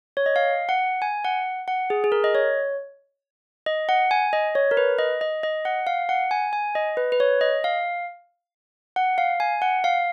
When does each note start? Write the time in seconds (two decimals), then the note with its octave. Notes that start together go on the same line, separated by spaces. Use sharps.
0.17 C#5
0.26 D#5
0.36 F5
0.69 F#5
1.02 G#5
1.25 F#5
1.68 F#5
1.90 G#4
2.04 G#4
2.12 A#4
2.24 D#5
2.35 C#5
3.66 D#5
3.89 F#5
4.11 G#5
4.33 D#5
4.55 C#5
4.71 A#4
4.77 B4
4.99 D#5
5.21 D#5
5.43 D#5
5.65 F#5
5.87 F5
6.09 F#5
6.31 G#5
6.53 G#5
6.75 D#5
6.97 B4
7.12 B4
7.20 C#5
7.41 D#5
7.64 F5
8.96 F#5
9.18 F5
9.40 G#5
9.62 F#5
9.84 F5